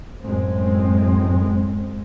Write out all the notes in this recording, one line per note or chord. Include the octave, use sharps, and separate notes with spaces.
F#2 A2 G#3 C4